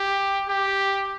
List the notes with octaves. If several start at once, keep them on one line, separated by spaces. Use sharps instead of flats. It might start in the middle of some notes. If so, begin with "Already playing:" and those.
Already playing: G4
G4